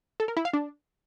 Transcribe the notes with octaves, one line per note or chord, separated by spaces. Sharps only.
A4
A#4
E4
F5
D4